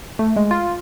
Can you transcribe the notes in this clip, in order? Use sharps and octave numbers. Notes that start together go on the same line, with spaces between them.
A3
G#3
F4